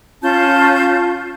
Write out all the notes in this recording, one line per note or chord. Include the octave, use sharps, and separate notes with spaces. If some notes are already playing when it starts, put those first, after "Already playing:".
C#4 F4 A5 G6